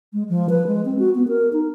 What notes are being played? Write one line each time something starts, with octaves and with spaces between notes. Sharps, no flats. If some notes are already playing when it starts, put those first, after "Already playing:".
G#3
F3
B4
G#3
C4
F#4
B3
A#4
D#4